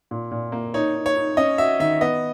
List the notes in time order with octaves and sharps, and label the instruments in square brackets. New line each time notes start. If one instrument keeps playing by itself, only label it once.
[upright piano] A#2
A#2
A#3
[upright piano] D#4 [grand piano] C#5
[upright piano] D#4
[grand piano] C#5
[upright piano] D#4
[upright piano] C#4 [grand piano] D#5
[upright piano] F#4 [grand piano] E5
[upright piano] D#3 [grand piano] E5
[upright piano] B3 [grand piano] D#5